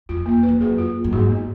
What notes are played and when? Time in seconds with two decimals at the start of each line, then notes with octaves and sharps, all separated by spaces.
0.09 F2 F4
0.26 A#3
0.43 B4
0.48 F2
0.61 F#2 G#4
0.78 F4
0.95 A#3
1.04 F#2
1.12 G#2 F#4
1.30 B3